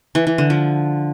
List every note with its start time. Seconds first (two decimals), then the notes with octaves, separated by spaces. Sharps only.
0.15 E3
0.27 E3
0.38 D3
0.50 F3